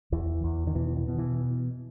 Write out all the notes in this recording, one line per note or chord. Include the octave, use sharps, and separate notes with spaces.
E2 E3
E2
D#3
B2 E3
E3
B2
E3